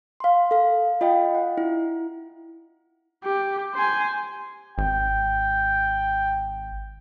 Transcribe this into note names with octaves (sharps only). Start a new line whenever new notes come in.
F5 C6
A4 F5
F4 D#5 F5 G5
F#5
E4
G4
C5 G#5
G#1 G5